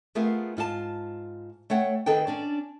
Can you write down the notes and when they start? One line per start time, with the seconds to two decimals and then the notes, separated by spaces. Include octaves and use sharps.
0.15 A3 B3 F4 G#4 A#4
0.57 G#2 F4 F#4 A5
1.70 A3 C#5 F#5 G5
2.06 D#3 G#4 A4 B4 G5
2.27 C#4 D4 D5